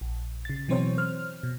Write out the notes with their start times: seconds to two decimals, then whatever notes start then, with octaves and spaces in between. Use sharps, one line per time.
0.01 A#1
0.45 C#3 A6
0.68 B2 E3 F#3 C4 C5 C#5
0.98 C5 F6
1.43 B2